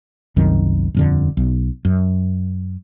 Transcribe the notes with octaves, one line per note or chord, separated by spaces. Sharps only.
F#1 C2 F#2 D#3
D#1 F2 D3
B1
F#2